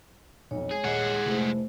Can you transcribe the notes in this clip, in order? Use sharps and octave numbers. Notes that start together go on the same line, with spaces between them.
B1 F2 C#5
G#3 G#4
D#1 G#3 D#5 F#5
F1 A3 E4 C5